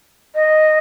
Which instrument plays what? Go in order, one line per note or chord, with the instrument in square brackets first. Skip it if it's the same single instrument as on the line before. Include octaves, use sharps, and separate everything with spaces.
[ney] D#5